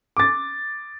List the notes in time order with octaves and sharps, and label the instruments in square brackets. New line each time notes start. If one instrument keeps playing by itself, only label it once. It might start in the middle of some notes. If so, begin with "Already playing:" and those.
[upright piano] D6 A6